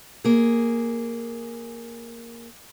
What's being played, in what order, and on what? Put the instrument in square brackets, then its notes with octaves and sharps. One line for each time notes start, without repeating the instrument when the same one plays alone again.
[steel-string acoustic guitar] A#3 G#4